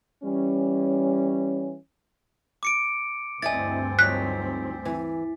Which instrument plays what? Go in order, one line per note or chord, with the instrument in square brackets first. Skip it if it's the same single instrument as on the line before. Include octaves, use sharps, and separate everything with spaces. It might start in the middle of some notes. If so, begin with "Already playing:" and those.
[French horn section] E3 G3 C#4
[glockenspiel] D6 C#7 D7
[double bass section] D2 G2 C4 [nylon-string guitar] E4 D5 D#5 [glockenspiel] G#5 A6
[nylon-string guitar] F3 F#3 D#4 [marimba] F#6 [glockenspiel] B6
[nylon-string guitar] E3